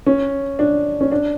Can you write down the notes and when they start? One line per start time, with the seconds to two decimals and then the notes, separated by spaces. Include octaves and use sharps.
0.06 C#4
0.59 D4
1.01 C#4
1.12 D4